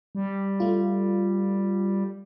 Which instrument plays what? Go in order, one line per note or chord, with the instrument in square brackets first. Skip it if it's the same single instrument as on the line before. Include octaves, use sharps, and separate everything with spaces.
[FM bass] G3
[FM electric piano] A3 F4